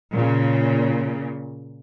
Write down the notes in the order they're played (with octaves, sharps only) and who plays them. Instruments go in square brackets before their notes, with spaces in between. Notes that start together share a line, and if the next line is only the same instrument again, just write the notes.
[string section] A#2 C#3